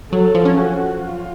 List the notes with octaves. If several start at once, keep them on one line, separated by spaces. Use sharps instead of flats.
F#3 A4
F3
C#4
F#4
F4